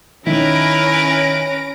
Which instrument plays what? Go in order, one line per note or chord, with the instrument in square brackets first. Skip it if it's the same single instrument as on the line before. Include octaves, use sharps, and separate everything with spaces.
[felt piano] D#3 [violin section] C#4 A#6 D7 [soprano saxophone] E4 [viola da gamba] A#4 B4